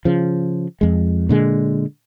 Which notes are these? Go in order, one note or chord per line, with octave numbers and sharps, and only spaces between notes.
C#3 F3
F2 G#3
A#2 D3 G#3